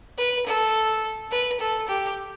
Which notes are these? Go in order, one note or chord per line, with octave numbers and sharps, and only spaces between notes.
B4
A4
B4
A4
G4